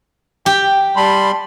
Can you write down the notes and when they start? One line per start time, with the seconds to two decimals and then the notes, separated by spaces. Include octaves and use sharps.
0.46 G4 G5
0.96 G3 A5 B5 C6